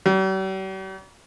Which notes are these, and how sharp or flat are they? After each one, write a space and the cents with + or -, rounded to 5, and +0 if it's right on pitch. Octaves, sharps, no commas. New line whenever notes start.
G3 -45